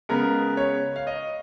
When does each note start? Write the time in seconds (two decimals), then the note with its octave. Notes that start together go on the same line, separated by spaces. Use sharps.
0.09 C#3 G#3 B3 A#4
0.57 C#5
0.96 F5
1.07 D#5